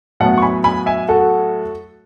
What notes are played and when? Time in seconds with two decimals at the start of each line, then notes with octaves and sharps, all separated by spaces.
0.20 A2 F#3 B3 F#5 A5
0.38 C#6
0.42 G#5 B5
0.64 G#5 B5
0.86 E5 G#5
1.08 F#4 A4